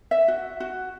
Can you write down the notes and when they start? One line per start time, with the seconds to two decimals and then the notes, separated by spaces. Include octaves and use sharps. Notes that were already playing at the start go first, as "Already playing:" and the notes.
0.11 E5
0.28 F#4
0.60 F#4